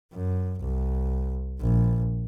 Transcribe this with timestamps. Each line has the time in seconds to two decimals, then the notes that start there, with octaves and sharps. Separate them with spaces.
0.14 F#2
0.60 C2
1.60 A#1